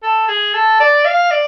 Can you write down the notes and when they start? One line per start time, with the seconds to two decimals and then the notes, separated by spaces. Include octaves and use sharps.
0.03 A4
0.28 G#4
0.54 A4
0.80 D5
1.05 F5
1.31 D5